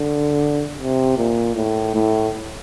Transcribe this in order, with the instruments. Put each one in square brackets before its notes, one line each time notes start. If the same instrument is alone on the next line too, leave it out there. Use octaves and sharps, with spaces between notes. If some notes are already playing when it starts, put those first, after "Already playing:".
Already playing: [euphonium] D3
C3
A#2
A2
A2